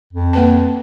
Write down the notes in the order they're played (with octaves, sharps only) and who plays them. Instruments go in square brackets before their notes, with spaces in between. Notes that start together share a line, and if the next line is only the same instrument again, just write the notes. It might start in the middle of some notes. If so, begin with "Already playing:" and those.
[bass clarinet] F2
[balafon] A#3 B4 A5